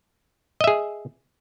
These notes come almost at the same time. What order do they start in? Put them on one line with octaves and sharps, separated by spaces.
D#5 E5 G#4